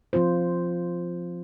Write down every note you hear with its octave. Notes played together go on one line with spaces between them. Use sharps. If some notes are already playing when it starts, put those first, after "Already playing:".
F3 C4 F4 C5